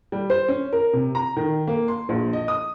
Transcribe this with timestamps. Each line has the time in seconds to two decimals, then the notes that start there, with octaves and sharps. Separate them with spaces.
0.12 G3
0.30 C5
0.48 C#4
0.73 A#4
0.93 C3
1.15 A#5
1.37 D#3
1.67 A#3
1.88 C6
2.09 A#1
2.33 D#5
2.48 D#6